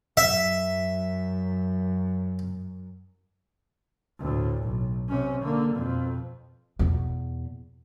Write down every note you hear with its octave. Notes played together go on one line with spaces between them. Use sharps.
F#2 E5
D2 A2
B1
C3 C#4
D3 A#3
F2 B2
E2 B2